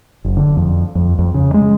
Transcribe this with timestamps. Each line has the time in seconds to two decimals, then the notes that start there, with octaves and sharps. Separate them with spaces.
0.25 F#1
0.37 D3
0.57 F2
0.95 F2
1.19 F2
1.34 C#3
1.54 G#3